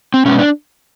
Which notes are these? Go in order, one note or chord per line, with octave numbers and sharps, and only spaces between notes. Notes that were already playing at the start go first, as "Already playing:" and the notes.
C4
B2 G#3 B3 C#4
D4